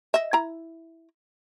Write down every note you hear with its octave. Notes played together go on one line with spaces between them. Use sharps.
D#5 E5
E4 A#5